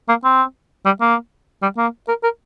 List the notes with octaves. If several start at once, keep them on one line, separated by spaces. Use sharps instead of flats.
A#3
C4
G3
A#3
G3
A#3
A#4
A#4